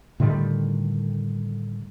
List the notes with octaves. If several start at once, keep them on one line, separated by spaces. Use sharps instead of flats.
A2 D3 D#3 G3